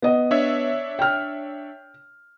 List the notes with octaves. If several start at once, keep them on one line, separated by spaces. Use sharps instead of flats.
B3 D#5
D4 C#5 E5
G5 F6